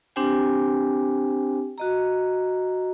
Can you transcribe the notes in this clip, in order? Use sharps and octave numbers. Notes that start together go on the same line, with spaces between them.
C4 D4 G4 C5 G5 G#5
F#4 D#5 A#5